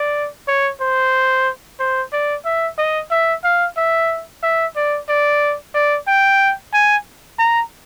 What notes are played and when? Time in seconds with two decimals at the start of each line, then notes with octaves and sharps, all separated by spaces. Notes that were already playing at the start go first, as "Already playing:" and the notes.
Already playing: D5
0.48 C#5
0.81 C5
1.79 C5
2.13 D5
2.45 E5
2.78 D#5
3.11 E5
3.44 F5
3.77 E5
4.43 E5
4.76 D5
5.09 D5
5.74 D5
6.07 G5
6.73 G#5
7.39 A#5